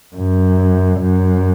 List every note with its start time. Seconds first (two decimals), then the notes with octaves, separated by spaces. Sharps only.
0.16 F#2
1.00 F#2